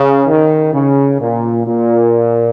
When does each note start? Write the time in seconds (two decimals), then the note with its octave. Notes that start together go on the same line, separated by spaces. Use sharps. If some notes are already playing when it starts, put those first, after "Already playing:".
Already playing: C#3
0.27 D#3
0.74 C#3
1.20 A#2
1.66 A#2